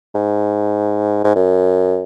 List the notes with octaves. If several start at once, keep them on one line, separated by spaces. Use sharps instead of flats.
G#2
G#2
F#2